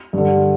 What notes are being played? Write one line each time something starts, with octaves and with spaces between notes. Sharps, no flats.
G2 D3